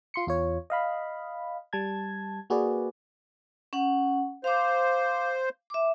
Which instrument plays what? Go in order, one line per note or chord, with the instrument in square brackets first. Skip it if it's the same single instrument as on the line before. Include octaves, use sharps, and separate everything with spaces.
[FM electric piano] F4 C6 C#7
E2 F4 C#5
D#5 F5 B5
G3 A5 G#6
A#3 F#4 G#4 B4 D5
[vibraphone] C#4 F#5
[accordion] C5 [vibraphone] F5 D6
[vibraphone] E5 D6